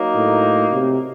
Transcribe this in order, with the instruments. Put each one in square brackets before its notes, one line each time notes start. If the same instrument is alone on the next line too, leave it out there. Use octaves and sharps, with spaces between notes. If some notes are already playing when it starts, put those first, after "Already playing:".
Already playing: [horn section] F#3 A#3 D#4
[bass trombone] A2
C3